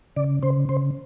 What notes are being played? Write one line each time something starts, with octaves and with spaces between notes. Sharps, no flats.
C#3 D5
C#3 C5
C#3 C5